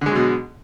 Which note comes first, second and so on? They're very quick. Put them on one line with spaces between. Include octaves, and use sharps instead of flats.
D3 G#3 F#3 B2